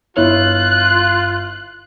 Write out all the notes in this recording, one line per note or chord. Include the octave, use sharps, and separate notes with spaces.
G1 E4 F4 C#5 F#6